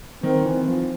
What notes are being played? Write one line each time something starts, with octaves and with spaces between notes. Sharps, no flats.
D#3 C4
E3
F3